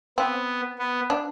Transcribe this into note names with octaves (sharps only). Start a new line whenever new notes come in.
B3 C4
B3
D4